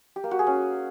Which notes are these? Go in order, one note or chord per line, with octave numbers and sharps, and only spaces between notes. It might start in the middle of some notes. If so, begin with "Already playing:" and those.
G4
A#3
F#4
G#4
C#4